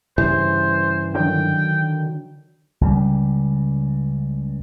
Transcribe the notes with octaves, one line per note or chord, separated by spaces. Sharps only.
G2 C#3 E3 C5
D3 D#3 F#3 G5
C#2 C#3 G3